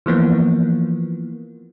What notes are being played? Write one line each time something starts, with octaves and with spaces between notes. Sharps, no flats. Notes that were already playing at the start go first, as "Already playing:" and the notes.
E3 F3 A#3 B3